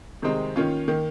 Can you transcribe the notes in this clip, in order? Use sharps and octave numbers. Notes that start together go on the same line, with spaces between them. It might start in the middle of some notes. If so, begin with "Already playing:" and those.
C3 D#3 G#3 C4 D#4
D#3 A#3 C#4 F4
D#3 A#3